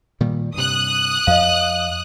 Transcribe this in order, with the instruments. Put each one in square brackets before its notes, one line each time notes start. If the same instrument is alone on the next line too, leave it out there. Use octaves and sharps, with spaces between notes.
[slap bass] A#2 D#3 G3
[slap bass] G2 C3 [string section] D#6 F#6
[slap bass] F2 [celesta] D#5 F5